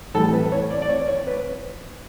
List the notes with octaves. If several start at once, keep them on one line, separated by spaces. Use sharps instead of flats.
A2 E3 G3 A4
B4
C#5
D5
D5
C#5
C#5
B4